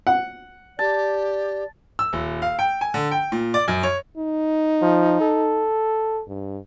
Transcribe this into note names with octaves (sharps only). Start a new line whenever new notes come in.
F#5
G4 D5 A5
E6
D#1
F5
G5
G#5
D3
G5
A#2
D5
F#2
C#5
D#4
F3
A4
G2